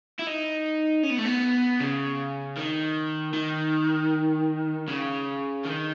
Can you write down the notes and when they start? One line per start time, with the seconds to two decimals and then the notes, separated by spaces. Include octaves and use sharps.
0.19 E4
0.27 D#4
1.03 C#4
1.10 B3
1.18 A3
1.25 B3
1.80 C#3
2.57 D#3
3.33 D#3
4.88 C#3
5.65 D#3